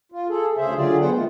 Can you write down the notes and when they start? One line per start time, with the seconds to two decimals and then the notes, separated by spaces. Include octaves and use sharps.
0.12 F4
0.29 G#4 A4
0.57 D2 C#3 G#4 C5 E5
0.77 D3 F#3 F4 G4 G#4 D5
1.01 B3 C5 F#5 G5
1.16 D#3 G#3 A3 F4